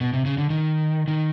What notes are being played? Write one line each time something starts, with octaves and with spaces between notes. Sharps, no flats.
B2
C3
C#3
D3
D#3
D#3